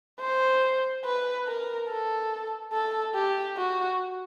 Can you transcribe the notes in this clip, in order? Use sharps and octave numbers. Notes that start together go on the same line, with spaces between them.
C5
B4
A#4
A4
A4
G4
F#4